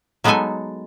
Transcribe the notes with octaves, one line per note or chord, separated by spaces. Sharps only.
F#3 G#3 B3 D#4 A4 G#5